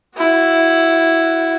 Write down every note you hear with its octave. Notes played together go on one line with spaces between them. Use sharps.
E4 F#4